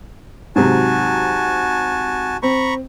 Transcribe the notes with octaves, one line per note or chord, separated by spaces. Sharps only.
G#2 C3 F#3 F#4 G#5 A5
C4 A#5 B5 C#6